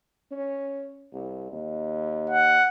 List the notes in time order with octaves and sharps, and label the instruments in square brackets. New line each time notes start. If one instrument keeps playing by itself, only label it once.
[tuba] C#4
C2
D#2
[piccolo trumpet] F#5